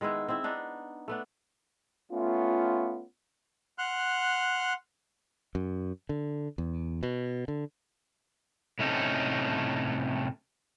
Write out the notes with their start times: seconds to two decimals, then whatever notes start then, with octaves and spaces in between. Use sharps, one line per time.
0.01 D#3 G#3 B3 E4
0.28 C4 E4
0.44 B3 D4 D#4
1.08 A3 B3 D4
2.12 A3 B3 C#4 F4
3.78 F#5 C6 F6 F#6
5.55 F#2
6.09 D3
6.58 E2
7.03 B2
7.48 D3
8.79 A2 C3 A3 C#4 D#4 A4